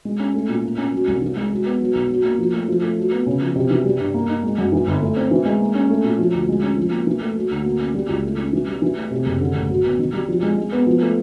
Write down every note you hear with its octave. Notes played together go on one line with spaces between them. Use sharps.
G#3
C#4
A3
A#2
A#3
C#4
F#3
C2
E3
G#3
F#3
B3
F#3
B1
F#3
A#3
F3
A3
F3
A3
F#3
B3
C#3
F3
C3
E3
G3
G2
A#3
D#4
G#3
F#2
E3
G1
A3
C4
E3
G#3
A#3
C#4
A3
A#2
F3
D2
G#3
C#4
F3
A#3
E3
A3
F#3
D2
A#3
C#4
G3
C#2
A3
C#4
E3
G3
E3
A3
C3
F#1
D3
A1
F#3
B3
D#3
G3
F3
G#3
G#3
B3
F3
A3